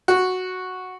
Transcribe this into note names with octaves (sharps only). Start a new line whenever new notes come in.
F#4